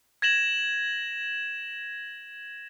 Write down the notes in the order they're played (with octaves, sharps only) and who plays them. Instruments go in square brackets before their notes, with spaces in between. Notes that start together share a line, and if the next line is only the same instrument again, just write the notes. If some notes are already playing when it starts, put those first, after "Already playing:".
[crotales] G#6 A#6 E7 F#7